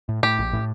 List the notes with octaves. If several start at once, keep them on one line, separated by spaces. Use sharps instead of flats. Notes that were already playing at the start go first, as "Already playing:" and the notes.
A2
A2 G4
A#1
A2